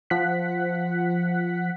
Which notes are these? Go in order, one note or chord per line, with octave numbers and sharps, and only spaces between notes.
F3 F#5 F#6 B6